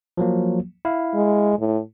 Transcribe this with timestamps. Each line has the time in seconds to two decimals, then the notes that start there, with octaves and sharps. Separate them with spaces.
0.17 F3 F#3 A#3
0.85 E4 F5
1.15 G#3
1.59 A2